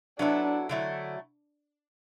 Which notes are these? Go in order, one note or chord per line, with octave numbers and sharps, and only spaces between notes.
F#3 B3 D4 E4 A4
D3 F#3 A3 E4